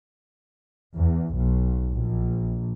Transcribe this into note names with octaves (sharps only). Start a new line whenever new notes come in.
E2
B1
A#1